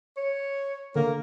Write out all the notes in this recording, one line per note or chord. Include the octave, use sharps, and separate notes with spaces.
C#5
D3 A#3